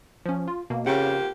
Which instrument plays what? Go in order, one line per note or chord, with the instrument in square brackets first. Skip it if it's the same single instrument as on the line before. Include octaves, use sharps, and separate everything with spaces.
[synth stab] F3 C#4
F4
B2 A#3
[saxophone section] F2 A#3 G4 [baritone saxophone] C#3 [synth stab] F#5